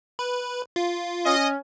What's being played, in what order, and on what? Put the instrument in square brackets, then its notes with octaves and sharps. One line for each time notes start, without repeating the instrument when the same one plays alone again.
[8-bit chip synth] B4
F4
[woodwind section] C#4 [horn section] D#5